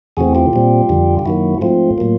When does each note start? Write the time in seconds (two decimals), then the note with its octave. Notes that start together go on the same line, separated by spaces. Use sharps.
0.17 E2 C3 E3 A3 C4 F#4 G#4
0.35 F4 G4
0.53 A#2 G3 C4
0.89 F2 D3 G3
1.19 G4
1.26 F#2 D#3 F#3 A#3 E4 F#4
1.61 G#2 F3 A3 C4 F4
1.98 A2 F#3 A#3